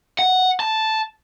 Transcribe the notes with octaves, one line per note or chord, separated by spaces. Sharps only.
F#5
A5